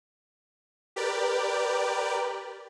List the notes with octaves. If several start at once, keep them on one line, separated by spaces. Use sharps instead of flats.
G4 A#4 B4 D5